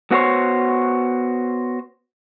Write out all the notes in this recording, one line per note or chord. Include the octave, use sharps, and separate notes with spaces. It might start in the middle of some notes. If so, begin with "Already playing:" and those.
B3 F#4 C5 C#5